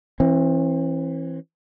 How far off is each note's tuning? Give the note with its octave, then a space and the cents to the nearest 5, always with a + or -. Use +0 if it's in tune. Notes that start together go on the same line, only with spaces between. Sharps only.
E3 +0 C4 +40